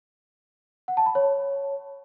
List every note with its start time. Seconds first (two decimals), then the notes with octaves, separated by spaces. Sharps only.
0.88 F#5
0.97 A5
1.06 B5
1.15 C#5